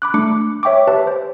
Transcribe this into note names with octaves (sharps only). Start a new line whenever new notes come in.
B5 D6 F#6
A3 D4 D6 C#7
C#5 E5 G5 C#6 D6
G4 B4 E5 A5
C5